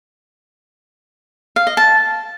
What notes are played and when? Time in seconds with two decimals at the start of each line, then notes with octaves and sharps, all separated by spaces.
1.56 F5
1.67 D#5
1.77 A5